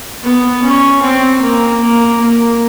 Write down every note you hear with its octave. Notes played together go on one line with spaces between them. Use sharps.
B3
C#4
C4
A#3
A#3
A#3